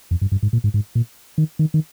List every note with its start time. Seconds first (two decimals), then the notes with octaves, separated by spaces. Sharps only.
0.11 F2
0.21 G2
0.32 G2
0.43 G#2
0.53 A#2
0.64 G#2
0.74 G#2
0.95 A#2
1.38 D#3
1.59 D#3
1.74 D#3